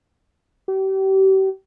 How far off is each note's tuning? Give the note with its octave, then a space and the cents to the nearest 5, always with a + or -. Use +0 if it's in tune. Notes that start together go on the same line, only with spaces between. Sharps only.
G4 -35